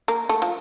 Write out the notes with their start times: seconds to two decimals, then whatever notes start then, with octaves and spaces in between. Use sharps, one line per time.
0.08 A#3
0.29 A3
0.42 F3